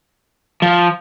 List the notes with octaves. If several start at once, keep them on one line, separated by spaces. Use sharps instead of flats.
F3